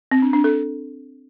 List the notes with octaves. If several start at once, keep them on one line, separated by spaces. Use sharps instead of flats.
C4
D4
D4
A4